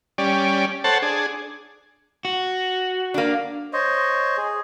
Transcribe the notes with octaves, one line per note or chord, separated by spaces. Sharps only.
G3 C#4 D5
A4 C5 C#5 F#5 A5
D4 G#4
F#4
A#3 D4
C5 C#5 D#5
G#4